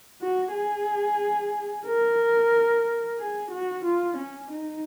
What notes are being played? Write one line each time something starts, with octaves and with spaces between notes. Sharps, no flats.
F#4
G#4
A#4
G#4
F#4
F4
C#4
D#4